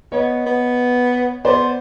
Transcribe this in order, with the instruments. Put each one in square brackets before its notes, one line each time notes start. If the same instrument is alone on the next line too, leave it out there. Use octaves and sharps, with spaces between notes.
[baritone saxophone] B3 [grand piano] C#5 D#5
[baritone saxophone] B3
[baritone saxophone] B3 [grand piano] C5 D5